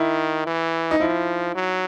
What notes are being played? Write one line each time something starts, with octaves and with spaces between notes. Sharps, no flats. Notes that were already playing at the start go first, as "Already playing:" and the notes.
Already playing: D#3 E4
E3
D#4
F3 E4
F#3